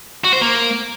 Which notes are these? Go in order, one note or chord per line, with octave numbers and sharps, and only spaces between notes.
F#4
C5
A#3